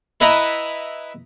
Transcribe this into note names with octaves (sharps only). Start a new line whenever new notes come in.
E4 B4 D#5 F#5 A#5 B5